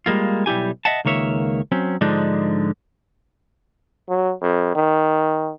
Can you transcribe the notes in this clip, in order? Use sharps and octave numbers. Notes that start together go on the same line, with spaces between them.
G3 G#3 A#3 F4
B1 G3 E4 G4 G#5
D#5 E5 F#5 A5
C#2 D#3 A#3 C#5 E5
F#3 C4 C#4
G#2 D3 F3 G#3 D4 D#4
F#3
F2
D#3